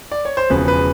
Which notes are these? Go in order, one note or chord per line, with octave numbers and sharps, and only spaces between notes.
D5
C#5
C5
E1 E2 C#3 F3 B4
B4